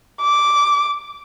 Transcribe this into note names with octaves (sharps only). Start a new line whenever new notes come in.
D6